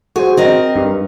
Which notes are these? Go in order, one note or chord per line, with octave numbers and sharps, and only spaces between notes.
F#4 G#4 C5
C4 A#4 D#5
G2